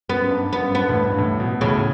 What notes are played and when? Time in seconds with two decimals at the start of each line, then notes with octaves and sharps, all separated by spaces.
0.09 F#2 B3
0.31 G2
0.53 F#2 B3
0.74 G2 B3
0.89 A2
0.97 G2
1.12 G2
1.18 A2
1.40 B2
1.61 A2 C#3